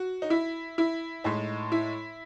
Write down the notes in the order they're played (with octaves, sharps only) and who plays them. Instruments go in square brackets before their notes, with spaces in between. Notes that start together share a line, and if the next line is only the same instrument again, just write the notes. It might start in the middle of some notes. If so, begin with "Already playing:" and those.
Already playing: [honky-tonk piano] F#4
D#4
E4
E4
A2 G#3 D#4
E4